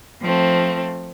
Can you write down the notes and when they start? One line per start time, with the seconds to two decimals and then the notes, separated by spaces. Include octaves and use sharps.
0.21 F3 A3 C4